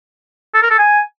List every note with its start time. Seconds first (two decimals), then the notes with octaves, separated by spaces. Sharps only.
0.54 A4
0.62 A#4
0.70 A4
0.78 G#5